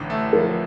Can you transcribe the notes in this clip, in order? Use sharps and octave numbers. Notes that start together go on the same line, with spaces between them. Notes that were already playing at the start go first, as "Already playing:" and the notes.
Already playing: A1 D3
A3
F3 A#4